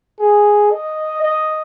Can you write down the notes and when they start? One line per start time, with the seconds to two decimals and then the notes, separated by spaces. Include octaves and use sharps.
0.20 G#4
0.71 D#5
1.22 D#5